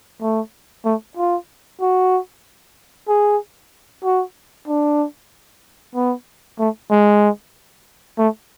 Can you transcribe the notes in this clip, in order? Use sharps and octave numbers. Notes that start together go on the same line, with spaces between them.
A3
A3
F4
F#4
G#4
F#4
D4
B3
A3
G#3
A3